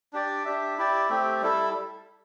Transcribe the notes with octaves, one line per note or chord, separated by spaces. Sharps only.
D4 G4 D5
D4 G4 E5
E4 G4 D5
A3 C4 G4
G3 E4 A4